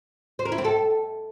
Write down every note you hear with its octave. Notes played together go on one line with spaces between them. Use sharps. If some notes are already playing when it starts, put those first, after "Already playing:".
C5
A#4
E4
C4
A4